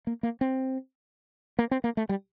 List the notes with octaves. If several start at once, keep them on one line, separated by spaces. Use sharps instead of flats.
A#3
A#3
C4
A#3
C4
A#3
A3
G3